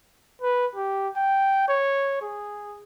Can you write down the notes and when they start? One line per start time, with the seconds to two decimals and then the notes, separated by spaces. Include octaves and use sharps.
0.42 B4
0.75 G4
1.16 G5
1.68 C#5
2.22 G#4